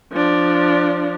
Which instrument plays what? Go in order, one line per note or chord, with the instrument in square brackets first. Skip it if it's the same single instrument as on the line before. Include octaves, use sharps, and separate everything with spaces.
[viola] F3 D4